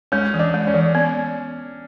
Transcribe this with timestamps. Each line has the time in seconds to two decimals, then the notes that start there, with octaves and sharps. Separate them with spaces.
0.12 G#3 C#4
0.34 E3
0.39 D4
0.54 G#3
0.67 C#4
0.74 E3
0.95 B3